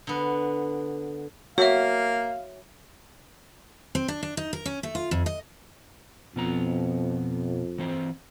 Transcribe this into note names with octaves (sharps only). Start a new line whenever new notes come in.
D3 B3
A#3 F#4 C#5 E5 F5
C4
D4
D4
D#4
A#4
C#4
A3
F4
F2
D#5
F2 B2 B3 A#5
E3 C4 C5